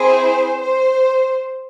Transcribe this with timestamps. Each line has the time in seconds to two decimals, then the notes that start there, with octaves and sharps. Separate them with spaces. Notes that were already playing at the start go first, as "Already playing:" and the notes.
Already playing: C4 E4 G#4 C5
0.60 C5